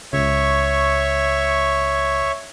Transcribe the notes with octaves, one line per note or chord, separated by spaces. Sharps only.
C#2 C#5 E5 C#6